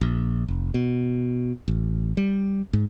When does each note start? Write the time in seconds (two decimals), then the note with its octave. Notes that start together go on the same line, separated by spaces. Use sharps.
0.01 A#1
0.48 F1
0.74 B2
1.68 A1
2.17 G3
2.73 G#2